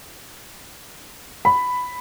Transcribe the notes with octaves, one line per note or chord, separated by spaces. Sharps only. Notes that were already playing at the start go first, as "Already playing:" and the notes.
B5